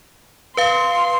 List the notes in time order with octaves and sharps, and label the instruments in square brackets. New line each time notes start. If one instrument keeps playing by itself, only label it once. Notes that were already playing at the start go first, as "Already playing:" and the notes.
[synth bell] B4 F5 [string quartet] C6